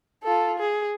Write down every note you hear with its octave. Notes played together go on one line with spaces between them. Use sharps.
F4 A4
G#4